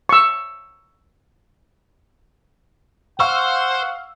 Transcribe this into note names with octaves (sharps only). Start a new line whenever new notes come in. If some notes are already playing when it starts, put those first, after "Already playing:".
C#6 E6
C5 F5 F#5 C#6 E6